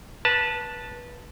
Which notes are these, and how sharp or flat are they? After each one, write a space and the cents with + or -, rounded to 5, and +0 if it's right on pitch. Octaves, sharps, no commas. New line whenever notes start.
B4 -20 A5 +0